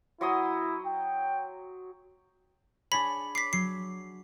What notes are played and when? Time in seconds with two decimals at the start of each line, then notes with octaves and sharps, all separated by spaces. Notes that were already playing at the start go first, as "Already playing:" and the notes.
0.21 F#3 E4 C6 D#6
0.87 G5
2.92 D4 G#4 C#5 B5 B6
3.35 D6 B6 C7
3.53 F#3 C7